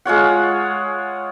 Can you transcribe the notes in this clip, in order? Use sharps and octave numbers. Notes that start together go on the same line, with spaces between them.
G#3 F4 C#5 F#5